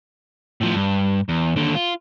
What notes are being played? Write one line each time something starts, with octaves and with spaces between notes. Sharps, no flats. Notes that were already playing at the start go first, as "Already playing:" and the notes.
A2 F3
G2
E2
D#2 D3
F4